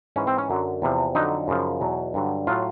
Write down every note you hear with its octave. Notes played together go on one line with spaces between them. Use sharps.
G#2 E3 C#4
C4
C#4
F#2 D3 F#3
E2 C3 F3
F2 D3 F#3 D#4
F#2 C#3 F3
E2 B2 F#3
G2 D3 F#3
A2 F#3 F4